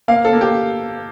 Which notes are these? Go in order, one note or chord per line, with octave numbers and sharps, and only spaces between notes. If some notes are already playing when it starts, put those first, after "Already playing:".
A#3 F5
A4
A#3
G4